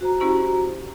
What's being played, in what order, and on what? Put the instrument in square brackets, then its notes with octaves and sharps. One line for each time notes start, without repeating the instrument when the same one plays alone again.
[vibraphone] F#4 C5 A#5
[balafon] C#4 E4 G4